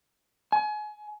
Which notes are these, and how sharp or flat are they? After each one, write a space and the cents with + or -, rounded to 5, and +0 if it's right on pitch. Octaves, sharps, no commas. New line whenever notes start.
G#5 +30